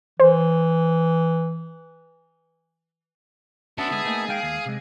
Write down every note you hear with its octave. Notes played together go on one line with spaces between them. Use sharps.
E3 C5
B3 C#4 D4 F#4 E5 A5
D3 G#3 G#4
A3 A#3 D#4
G#3 D#4 F5 G5
D#2
C3 G#3